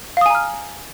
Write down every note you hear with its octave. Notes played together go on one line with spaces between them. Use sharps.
F5 G#5 A#5 D#6 F6